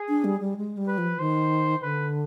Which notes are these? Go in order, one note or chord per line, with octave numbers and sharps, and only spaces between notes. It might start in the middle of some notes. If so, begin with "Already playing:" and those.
Already playing: G#4
D4
G3
G3
G#3
G3
B4
F3
D#3 C5
D3 B4